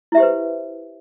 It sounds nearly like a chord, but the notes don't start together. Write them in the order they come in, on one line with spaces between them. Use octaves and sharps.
E4 E5 G4 C5 B4